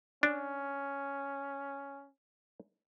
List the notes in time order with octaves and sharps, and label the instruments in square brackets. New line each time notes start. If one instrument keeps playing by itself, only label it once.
[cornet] C#4 [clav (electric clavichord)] D4